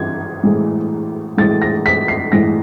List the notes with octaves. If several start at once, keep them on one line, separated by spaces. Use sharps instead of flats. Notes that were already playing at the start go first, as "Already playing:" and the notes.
Already playing: E3 G#6
A2 E3 G#3
A2 E3 G#3 A6
A#6
B6
C7
A2 E3 G#3 A#6